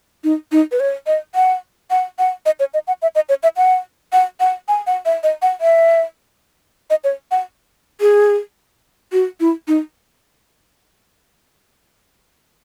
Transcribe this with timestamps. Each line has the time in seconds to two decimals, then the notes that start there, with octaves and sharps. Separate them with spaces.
0.24 D#4
0.52 D#4
0.72 B4
0.80 C#5
1.07 D#5
1.35 F#5
1.90 F#5
2.19 F#5
2.46 D#5
2.60 C#5
2.74 D#5
2.87 F#5
3.02 E5
3.15 D#5
3.29 C#5
3.43 E5
3.57 F#5
4.13 F#5
4.40 F#5
4.68 G#5
4.87 F#5
5.05 E5
5.23 D#5
5.42 F#5
5.61 E5
6.90 D#5
7.04 C#5
7.31 F#5
8.01 G#4
9.12 F#4
9.40 E4
9.68 D#4